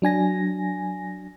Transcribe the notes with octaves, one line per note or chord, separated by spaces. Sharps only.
F#3 D4 G#5 A#6